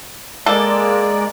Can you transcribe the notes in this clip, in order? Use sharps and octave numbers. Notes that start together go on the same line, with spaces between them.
G#3 A#3 A4 D5